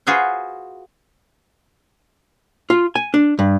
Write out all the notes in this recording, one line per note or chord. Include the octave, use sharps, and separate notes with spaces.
F4 F#4 G#4 B4 C5
F4
G#5
D4
G2